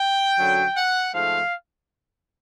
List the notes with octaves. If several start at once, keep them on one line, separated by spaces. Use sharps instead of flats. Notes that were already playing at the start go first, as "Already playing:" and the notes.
Already playing: G5
F#2 D3 F#3
F#5
G#2 F3 A3 F5